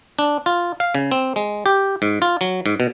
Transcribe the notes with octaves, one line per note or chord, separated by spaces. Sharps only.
D4
F4
F5
C#3
C4
G#3
G4
G#2
F4
F#3
G#2
B2